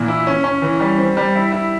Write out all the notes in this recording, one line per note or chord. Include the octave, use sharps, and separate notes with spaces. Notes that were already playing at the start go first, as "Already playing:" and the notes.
Already playing: A#2 E3
E4
C#4
C#4
E3
G3
C4
G3
E4
E4